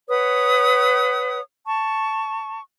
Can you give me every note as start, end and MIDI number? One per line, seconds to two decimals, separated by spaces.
0.09 1.40 71
0.09 1.40 73
0.09 1.40 78
0.09 1.40 87
1.65 2.59 81
1.65 2.59 85